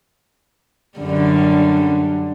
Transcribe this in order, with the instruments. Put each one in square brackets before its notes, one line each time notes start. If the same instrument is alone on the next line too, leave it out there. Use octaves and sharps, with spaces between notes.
[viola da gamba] F#2 D3 G3